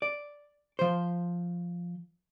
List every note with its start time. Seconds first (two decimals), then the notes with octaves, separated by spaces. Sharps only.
0.02 D5
0.79 F3 C5